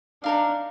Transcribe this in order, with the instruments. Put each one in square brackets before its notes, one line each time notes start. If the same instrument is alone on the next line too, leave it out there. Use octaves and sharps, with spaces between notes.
[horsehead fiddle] D4 [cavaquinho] D#4 A#4 F5